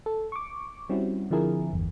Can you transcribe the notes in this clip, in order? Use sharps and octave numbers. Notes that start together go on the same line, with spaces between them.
A4
C#6 D6
G3 C4 C#4 E4 F#4
D3 F3 C4 E4 G#4 A#4
G1 E2